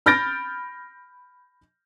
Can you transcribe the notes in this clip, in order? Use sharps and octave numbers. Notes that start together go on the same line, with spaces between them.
B5 F6 G6 A6 A#6 D7